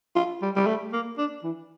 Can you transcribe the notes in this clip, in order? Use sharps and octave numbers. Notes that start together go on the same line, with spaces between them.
F4
G3
G3
A3
A#3
D4
E3